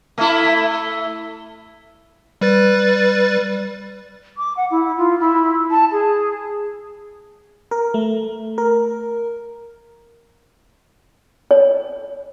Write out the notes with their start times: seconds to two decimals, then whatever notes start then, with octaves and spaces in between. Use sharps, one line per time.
0.18 A3 E4
2.41 G3 B4 A6
4.37 D6
4.57 F#5
4.71 E4
4.97 F4
5.20 E4
5.71 A5
5.92 G#4
7.71 A#4
7.94 A3
8.58 A#4
11.51 C#5